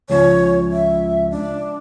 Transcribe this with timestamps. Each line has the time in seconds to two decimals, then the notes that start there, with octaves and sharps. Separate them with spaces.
0.10 C#2 F3 C#5
0.71 E5
1.31 D4